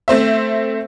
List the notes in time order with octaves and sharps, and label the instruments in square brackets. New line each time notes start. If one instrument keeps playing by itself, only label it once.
[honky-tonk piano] A3 C4 C5 E5